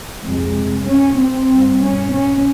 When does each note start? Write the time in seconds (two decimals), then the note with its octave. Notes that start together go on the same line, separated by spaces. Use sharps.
0.23 F2 C3 G#3
0.87 C#4
1.19 C4
1.49 G2
1.82 C#4
2.13 C#4